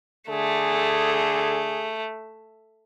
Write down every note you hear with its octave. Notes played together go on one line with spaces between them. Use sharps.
D3 A3 G#4